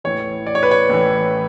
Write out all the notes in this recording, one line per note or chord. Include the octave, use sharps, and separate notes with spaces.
A1 A2 E3 C#5
D5
C#5
B4
C#5
A1 A2 E3